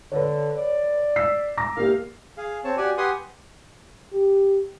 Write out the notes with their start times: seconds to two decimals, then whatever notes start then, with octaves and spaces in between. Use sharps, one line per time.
0.12 D3 B4 C#5
0.57 D5
1.16 E6 B6 C7
1.57 A#5 D6 A#6
1.77 E2 A#3 G4 F5
2.37 G#4 F5
2.64 C4 C#5 A5
2.77 F#4 G4 D5 G#5
2.98 G4 B4 F#5 G#5 C6 D#6
4.13 G4